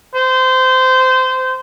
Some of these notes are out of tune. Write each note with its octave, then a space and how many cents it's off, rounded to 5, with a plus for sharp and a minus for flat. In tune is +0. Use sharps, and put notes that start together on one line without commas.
C5 -20